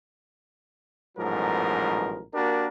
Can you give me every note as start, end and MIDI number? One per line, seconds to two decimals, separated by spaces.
1.18 2.23 33
1.18 2.23 44
1.18 2.23 47
1.18 2.23 53
1.18 2.23 54
1.18 2.23 70
2.33 2.67 58
2.33 2.67 62
2.33 2.67 66
2.33 2.67 67
2.33 2.67 70